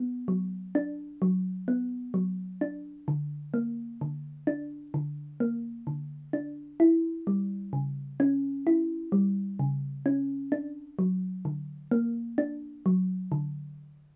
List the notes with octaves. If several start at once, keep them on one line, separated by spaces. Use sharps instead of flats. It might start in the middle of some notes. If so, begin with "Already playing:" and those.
Already playing: B3
F#3
D4
F#3
B3
F#3
D4
D3
A#3
D3
D4
D3
A#3
D3
D4
E4
G3
C#3
C#4
E4
G3
C#3
C#4
D4
F#3
D3
A#3
D4
F#3
D3